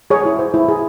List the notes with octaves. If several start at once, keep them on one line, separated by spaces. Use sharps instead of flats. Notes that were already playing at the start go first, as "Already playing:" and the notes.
G#4 C#5
E4
C5
E4
G#4